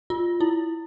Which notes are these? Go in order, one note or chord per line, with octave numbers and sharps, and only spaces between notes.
F4
E4